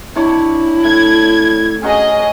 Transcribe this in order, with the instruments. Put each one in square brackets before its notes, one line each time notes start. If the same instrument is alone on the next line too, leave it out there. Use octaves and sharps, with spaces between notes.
[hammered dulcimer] C3 D4 C#5 [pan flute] E4
[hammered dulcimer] A2 [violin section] G#6
[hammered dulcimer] C#4 D#4 F#4 [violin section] G#4 D#5